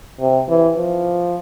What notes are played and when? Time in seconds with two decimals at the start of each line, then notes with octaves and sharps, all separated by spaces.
0.20 C3
0.48 E3
0.78 F3